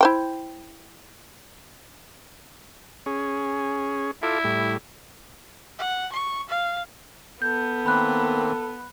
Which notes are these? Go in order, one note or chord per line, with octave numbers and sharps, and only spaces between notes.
E4 C5 G5
C#4 G#4
E4 F4 A4 D6
A2 G3
F#5
C#6
F5
B3 A4 G6
D#3 A#3 C4 B5 F#6